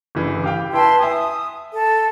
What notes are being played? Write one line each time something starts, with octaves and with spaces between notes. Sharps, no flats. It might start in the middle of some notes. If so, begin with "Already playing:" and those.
G1 C#3 E3
G4 F5 G5
E4 B4 G5 A5 C6
E5 G#5 D#6
A4